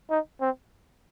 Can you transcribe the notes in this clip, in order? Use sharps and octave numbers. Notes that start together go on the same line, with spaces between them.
D#4
C4